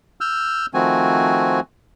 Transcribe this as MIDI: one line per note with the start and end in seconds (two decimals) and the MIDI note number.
0.21 0.66 88
0.21 0.66 89
0.21 0.66 91
0.74 1.60 51
0.74 1.60 53
0.74 1.60 57
0.74 1.60 60
0.74 1.60 66
0.74 1.60 80